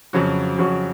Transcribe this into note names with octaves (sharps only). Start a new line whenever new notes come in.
F2 C#3 F#3 C#4 F#4
F2 C#3 F#3 C#4 F#4